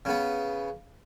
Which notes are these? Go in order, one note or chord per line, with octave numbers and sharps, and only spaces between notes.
C#3 B3